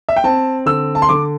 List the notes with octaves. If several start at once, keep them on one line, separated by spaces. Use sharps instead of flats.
E5
G5
C4 A5
D3 E6
A5
C6
D3 D6